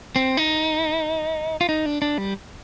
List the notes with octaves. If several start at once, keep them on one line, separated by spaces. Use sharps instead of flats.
C4
D#4
F4
D#4
D4
D4
G3